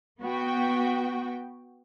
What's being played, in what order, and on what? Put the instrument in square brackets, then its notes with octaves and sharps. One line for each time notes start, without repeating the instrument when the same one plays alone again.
[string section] B3 F#4 G5